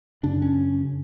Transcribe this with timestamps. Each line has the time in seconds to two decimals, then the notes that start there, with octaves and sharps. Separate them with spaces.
0.23 F#2 C#3 D4
0.42 C#4